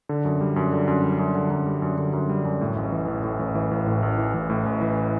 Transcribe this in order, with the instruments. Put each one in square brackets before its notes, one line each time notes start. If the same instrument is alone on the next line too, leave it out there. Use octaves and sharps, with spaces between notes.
[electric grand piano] D3
F#2
G3
F#2
D3
F#2
G3
F#2
D3
F#2
G3
F#2
D3
F#2
G3
F#2
A2
A1
E3
A1
A2
A1
E3
A1
A2
A1
E3
A1
A2
A1
E3